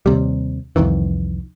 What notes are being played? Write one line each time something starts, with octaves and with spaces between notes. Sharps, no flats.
D#2 C3 G3
C2 F2 D#3 E3